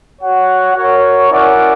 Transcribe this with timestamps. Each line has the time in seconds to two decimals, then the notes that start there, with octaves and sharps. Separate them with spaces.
0.20 F#4 C#5 F#5
0.75 F#4 A#4 C#5
1.30 C#4 E4 A#4 D5 F#5